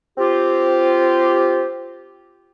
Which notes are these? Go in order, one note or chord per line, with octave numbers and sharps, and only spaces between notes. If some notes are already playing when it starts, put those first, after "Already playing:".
C4 F4 G4